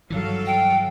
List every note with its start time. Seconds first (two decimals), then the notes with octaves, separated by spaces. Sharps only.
0.10 G2 D#3 E3 F#3 A4 F5
0.46 G5